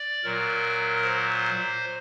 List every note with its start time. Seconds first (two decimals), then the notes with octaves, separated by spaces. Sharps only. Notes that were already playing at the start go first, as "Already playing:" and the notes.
Already playing: D5
0.24 A#2 F#3 A#4
1.03 C5